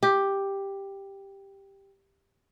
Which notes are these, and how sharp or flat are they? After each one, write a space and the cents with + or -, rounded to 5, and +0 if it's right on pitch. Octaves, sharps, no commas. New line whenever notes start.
G4 +5